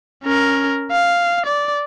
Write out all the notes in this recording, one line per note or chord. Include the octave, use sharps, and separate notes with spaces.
C#4 A#4
F5
D5